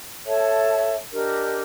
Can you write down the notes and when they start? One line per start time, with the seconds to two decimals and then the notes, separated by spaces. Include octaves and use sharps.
0.25 A4 C#5 E5 A5
1.11 D4 G4 A#4 D#5